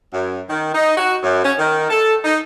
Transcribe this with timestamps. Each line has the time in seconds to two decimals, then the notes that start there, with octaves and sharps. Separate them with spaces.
0.14 F#2
0.50 D#3
0.75 D#4
0.98 F#4
1.23 F#2
1.44 C#4
1.59 D#3
1.90 A4
2.25 D#4